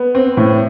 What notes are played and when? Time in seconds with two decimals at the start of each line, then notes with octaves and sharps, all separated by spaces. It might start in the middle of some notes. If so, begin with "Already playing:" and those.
Already playing: B3
0.15 C4
0.37 A2